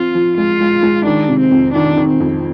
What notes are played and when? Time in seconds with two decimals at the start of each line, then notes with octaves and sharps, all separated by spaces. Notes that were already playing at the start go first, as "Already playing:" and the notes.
Already playing: F3 C4 F4
0.15 F3
0.37 G#3 F4
0.61 G#3
0.83 G#3
1.05 D#3 D4
1.28 C3
1.40 C4
1.51 F2
1.74 D#3 D4
1.97 D#3
2.09 C4
2.20 F2